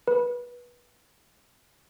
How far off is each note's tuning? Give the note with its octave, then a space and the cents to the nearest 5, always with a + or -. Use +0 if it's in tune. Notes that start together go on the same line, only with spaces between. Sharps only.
B4 -20